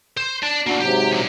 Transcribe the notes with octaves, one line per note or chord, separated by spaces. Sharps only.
C5
D5 A5
A#3 D4 E4 F#4
G#2 C3 F#3 G4
F3 D4